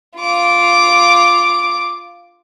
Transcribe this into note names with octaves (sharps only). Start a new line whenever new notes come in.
F4 D6